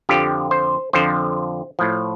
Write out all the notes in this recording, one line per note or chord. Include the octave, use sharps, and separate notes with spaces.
F2 D3 F3 G4
C5
F2 D3 F3 C5
A2 F3